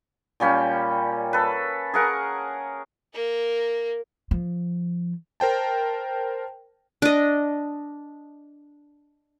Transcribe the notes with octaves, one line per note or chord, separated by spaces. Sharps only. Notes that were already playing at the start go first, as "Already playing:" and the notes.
A#2 G3 C#4 G5
A4 B4
G#4 A#4 F#5
A#3 A#4
F3
A#4 C5 G5 A5
D4 D#5